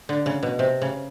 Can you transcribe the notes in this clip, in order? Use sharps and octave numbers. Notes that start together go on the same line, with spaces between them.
D3
C#3
B2
C3
C#3